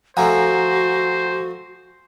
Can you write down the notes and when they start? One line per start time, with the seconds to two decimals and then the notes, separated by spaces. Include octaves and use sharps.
0.17 F3 A3 F#4 C5 F#5 G#5 A#5